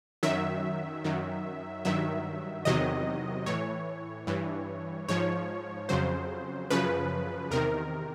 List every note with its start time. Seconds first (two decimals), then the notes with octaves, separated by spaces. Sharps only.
0.23 F#2 D#3 F#3 E5
1.04 F#2 D#3 F#3
1.85 G2 D#3 F#3 E5
2.65 E2 C3 D#3 F#3 D#5
3.46 A2 E3 C#5
4.27 G2 E3
5.09 G#2 F3 C#5
5.89 F2 C#3 F#3 C5
6.70 F#2 C#3 F3 B4
7.51 E2 C3 D#3 A#4